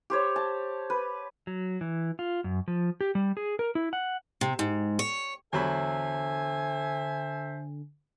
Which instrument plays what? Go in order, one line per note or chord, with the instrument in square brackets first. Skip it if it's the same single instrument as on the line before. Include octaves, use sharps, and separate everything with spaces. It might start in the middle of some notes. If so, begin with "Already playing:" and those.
[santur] G4 C5 C#5
A5
B4
[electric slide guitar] F#3
E3
F4
F#2
F3
G4
G3
G#4
A#4
E4
F#5
[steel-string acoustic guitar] C3
G#2
C#5
[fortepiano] E2 F#3 B5 [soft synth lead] D3 [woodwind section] A4 C5 E5 [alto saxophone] G#5